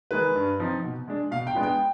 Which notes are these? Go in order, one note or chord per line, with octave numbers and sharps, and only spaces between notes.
D#3 G#3 B4
G2
F3 C4 D#4
B2
G#3 D4
B2 F5
G5
G#3 B3 D4 F4
G5